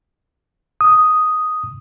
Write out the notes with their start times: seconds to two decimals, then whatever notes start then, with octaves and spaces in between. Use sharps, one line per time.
0.81 D#6